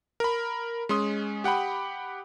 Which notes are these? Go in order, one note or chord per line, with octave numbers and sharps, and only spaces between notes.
A#4 B5
G#3 C#4 C6 D#6
G4 F#5 G5 B5